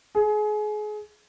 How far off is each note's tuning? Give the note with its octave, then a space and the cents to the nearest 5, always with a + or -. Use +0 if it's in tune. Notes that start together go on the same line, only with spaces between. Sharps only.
G#4 +30